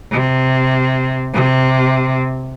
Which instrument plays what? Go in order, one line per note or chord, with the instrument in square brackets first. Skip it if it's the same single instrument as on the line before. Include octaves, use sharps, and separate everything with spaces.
[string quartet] C3
C3